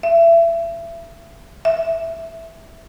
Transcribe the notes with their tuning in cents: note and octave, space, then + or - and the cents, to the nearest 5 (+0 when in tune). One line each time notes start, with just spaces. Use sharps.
E5 +30
E5 +0